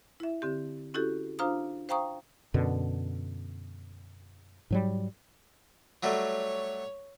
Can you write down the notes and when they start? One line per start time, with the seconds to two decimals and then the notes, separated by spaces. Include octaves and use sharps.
0.20 E4 E5
0.42 D3 C4 G4
0.94 C#4 E4 F#4 G4 A4
1.39 D4 F4 C5 F5 A#5 D#6
1.89 C5 F5 G5 A#5 C#6 D#6
2.54 F#2 B2 D3
4.70 G#2 F#3 G3
6.03 F#3 G3 A3 C#5